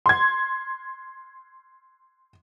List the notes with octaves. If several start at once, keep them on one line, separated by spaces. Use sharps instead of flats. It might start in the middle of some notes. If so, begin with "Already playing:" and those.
C6 G#6